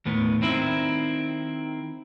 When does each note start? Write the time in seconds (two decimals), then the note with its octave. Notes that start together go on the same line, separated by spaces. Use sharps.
0.05 D#2 A2 B3
0.42 D#3 C4 E4